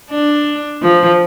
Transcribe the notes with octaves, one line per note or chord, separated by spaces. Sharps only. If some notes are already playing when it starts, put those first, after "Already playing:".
D4
F3